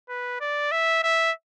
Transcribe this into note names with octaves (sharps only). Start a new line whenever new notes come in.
B4
D5
E5
E5